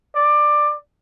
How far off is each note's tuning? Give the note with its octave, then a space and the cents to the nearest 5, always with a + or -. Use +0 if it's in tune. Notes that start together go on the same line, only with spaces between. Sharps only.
D5 +15